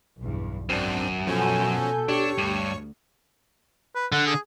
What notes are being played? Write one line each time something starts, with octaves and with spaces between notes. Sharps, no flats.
B1 E2 G2
G#1 F#2 C4 D4
B2 F3 C#4 F#4 A4 G#5 G6
D4 G4 C#5 C#6
D2 G2
B4
D3 F#5
G#4